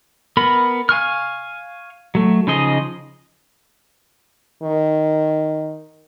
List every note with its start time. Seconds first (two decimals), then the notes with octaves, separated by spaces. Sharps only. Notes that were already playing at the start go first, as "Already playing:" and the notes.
0.37 B3 A#4 B5
0.89 F5 G#5 C#6 F6
2.15 F#3 A3
2.47 C#3 F3 D#4 G#4 D#5
4.62 D#3